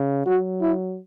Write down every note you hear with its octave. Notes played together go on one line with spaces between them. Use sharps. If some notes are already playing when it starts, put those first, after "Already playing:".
Already playing: C#3
F#3 F#4
E4